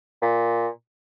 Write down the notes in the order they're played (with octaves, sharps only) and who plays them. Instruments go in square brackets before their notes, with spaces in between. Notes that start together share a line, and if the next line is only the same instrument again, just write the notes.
[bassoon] A#2